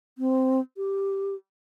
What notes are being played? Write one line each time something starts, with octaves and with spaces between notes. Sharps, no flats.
C4
G4